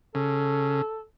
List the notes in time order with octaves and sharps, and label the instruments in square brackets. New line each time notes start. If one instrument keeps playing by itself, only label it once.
[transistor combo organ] C#3 [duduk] A4